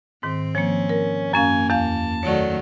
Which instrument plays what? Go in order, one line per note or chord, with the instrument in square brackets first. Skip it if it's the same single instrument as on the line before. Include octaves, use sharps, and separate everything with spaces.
[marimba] G#2 D#3 [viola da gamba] C4
[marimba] F3 A#3 [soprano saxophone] C#4
[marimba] A#4
[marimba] F#2 C#4 F5 [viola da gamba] A#3 [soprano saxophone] G#5
[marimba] E2 F5 [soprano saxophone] A5
[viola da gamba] D#3 F#3 A3 [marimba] C#5 D5